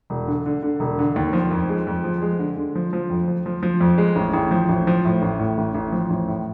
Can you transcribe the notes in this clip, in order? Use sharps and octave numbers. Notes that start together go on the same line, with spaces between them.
E1
D3
D3
D3
E1
D3
D#2
F3
F2
G#3
F2
F3
G#3
D3
D3
F3
F3
F2
F3
F3
F3
F2
G#3
A1
A1
F3
A1
F3
A2
A1
A2
A1
A1
F3
A1
A2